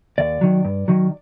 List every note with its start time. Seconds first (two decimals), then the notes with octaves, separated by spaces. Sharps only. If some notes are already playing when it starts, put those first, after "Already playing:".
0.18 D#2 D5
0.41 D#3 F#3
0.65 G2
0.88 D#3 F#3